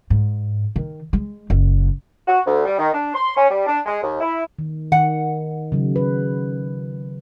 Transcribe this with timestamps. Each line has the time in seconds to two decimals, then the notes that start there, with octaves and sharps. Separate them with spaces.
0.10 G#2
0.76 D#3
1.13 G#3
1.50 F#1
2.28 F#4
2.46 D2
2.66 G3
2.78 D#3
2.93 D4
3.14 C6
3.37 C#4
3.50 G3
3.66 D4
3.86 G#3
4.02 D#2
4.21 E4
4.59 D#3
4.92 D#3 F#5
5.72 C#3 F#3
5.96 B4